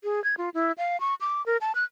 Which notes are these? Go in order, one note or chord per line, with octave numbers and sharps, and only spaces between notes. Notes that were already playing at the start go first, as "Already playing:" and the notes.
G#4
G#6
F4
E4
F5
C#6
D6
A#4
A5
F#6